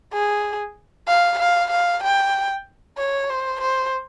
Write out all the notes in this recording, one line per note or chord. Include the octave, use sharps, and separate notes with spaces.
G#4
F5
F5
F5
G5
C#5
C5
C5